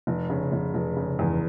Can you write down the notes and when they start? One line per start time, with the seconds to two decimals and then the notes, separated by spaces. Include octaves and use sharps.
0.07 F1
0.30 C#3
0.52 F1
0.74 F1
0.97 C#3
1.19 E2